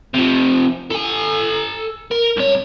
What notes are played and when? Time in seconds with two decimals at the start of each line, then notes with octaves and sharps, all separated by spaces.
0.14 C3 F3
0.90 A4 G#5
2.11 A#4
2.37 C2 C#5